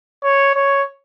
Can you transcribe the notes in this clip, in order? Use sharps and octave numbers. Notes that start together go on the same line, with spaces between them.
C#5
C#5